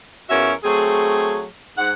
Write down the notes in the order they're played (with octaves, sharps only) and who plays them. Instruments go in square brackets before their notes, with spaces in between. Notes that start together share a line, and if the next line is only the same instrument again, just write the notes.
[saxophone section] E2 C#4 F4 F#4 A#4 E5
F#3 A3 C4 G#4
G#2 F#5